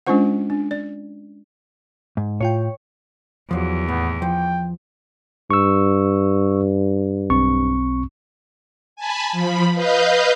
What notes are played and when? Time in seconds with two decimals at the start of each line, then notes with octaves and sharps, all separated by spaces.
0.06 G#3 C#4 D4 F4 C5 F#5
0.50 D4
0.71 D5
2.17 G#2
2.41 A2 F4 C#5 G5
3.51 E2 F3 F#3 G4
3.88 D#2 A2 B3
4.22 F3 G5
5.51 G2 C#6 E6
7.30 B1 C4 C#6
8.96 G#5 A5 B5
9.32 F3 B5
9.73 B4 D#5 F5 G6